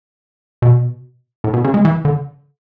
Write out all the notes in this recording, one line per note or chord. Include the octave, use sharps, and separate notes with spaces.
B2
A2
B2
C#3
G#3
E3
D3